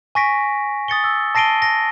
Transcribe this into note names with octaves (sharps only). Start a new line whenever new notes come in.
G#5 C#6 A#6 B6 D7
D#6 A6 C#7 G7
E6
A5 A#6 C7 D7 D#7 G7
A#6